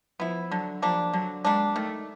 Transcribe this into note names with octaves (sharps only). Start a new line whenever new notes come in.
F3 B3 E4
D3 F#3
F3 G3 A#3 D4
D3 F#3
G3 G#3 A#3 D4
D#3 A3